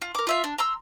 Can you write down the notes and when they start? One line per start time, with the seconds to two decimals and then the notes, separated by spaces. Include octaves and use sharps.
0.02 F4
0.15 A#4 D6
0.27 F4 E5 F5
0.44 D4
0.58 A#5 C6 E6